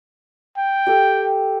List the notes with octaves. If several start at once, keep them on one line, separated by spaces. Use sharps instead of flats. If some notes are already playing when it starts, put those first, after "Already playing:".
G5
G4 A4